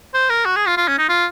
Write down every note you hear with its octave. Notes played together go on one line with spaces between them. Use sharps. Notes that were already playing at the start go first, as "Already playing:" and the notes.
C5
A#4
F#4
G#4
F4
F4
C#4
D#4
F4